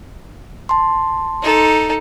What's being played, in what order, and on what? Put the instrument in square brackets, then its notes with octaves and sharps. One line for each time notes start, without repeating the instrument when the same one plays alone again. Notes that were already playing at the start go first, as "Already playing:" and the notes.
[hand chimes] A5 C6
[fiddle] D#4 A4